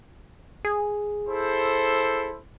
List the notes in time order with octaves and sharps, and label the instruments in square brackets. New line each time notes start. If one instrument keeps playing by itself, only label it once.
[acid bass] G#4
[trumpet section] E4 A4 C5